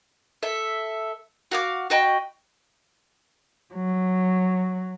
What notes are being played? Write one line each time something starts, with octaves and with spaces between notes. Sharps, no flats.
A4 E5
F#4 F5 D6
F#4 D#5 G5 B5
F#3